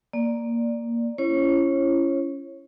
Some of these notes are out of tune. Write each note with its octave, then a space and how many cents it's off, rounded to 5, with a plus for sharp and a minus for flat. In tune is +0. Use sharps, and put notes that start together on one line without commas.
A#3 +0 D5 +0
C#4 +5 E4 +40 C#5 -35